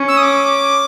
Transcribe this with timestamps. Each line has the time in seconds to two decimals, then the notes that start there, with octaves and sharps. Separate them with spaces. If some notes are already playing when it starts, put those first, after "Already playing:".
Already playing: C#4
0.08 E6
0.17 D#6
0.22 D6